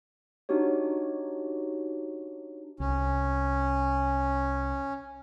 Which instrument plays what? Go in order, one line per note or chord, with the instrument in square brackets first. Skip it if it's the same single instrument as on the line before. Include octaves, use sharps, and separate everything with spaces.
[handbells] D4 D#4 F#4 G4 C#5
[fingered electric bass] C2 [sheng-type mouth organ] C#4